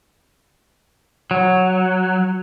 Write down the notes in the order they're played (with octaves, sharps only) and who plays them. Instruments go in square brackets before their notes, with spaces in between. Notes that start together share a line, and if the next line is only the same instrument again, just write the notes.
[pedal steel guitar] F#3